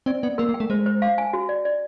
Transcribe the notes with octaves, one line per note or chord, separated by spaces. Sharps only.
C4 D5
B3 D5
A#3 A#4
A#3
G5
A3
G#3 C5
C5
F5
G#5
F#4
D5
D5